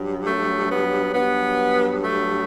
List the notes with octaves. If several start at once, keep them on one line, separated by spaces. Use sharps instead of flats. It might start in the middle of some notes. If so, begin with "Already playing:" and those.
Already playing: G2 F#3
A3
B3
G2 F#3 B3
A3